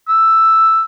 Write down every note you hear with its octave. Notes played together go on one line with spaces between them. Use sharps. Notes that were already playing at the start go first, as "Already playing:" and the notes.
E6